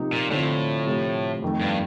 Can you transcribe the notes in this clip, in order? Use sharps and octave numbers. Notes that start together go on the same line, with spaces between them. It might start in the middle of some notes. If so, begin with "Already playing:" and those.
Already playing: C3 F3 A#3 D#4
A#2
A2 D3 F3 C4 F4
C3 F3 A3
F2 D#3 A3
G2